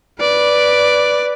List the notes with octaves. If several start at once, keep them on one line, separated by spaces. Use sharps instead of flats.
B4 D5